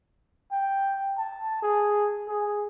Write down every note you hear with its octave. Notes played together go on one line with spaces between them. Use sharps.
G5
A5
G#4
G#4